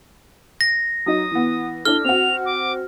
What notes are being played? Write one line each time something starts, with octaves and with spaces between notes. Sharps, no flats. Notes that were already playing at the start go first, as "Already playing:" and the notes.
A#6
F#3 D#4 D#6
E3 B3
D4 E4 A4 F6 G7
C4 F#4 F7
D6